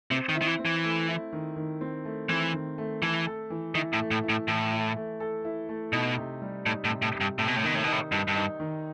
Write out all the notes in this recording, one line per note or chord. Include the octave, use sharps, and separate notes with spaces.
C3 C4
D#3
E4
D#3
E3
C4
E3
A3
E4
D#3
D#3
C4
A3
E3 C4
D#3
A3
E3 A4
A4
E3
D#3 E4
A2
A3
A2
E4
A2
A2 E3
E4
A3
A4
E4
A3
B2 D#4
C3
G3
A2 D#4
A2
C3
A2
C3
G2
A2 C3
B2
A2
B2 D#3
A2
B2 D#4
A2
G2 D#4
G2
D#4
D#3